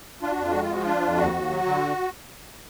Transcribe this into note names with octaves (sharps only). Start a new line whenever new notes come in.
D4 F4
F#4
F2 F4
G#3 F#4
F4
F3 F#4
D4 F4
F2
D#2 F#4
D#2
F#3
D3